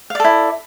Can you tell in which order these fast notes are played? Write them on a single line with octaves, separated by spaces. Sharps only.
F5 D5 A4 E4